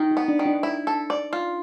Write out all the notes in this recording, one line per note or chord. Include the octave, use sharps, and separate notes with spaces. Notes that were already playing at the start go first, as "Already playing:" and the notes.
Already playing: D#3 D#4
D#4
B3
D4
D#3
D4
E4
A4
D5
F4